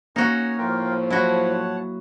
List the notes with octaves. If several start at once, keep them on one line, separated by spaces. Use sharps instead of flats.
A#3 C#4 D#4 F#4 C#5
A2 F3 F4 A#4 G5
F#3 E4 F#4 C#5 F#5 A5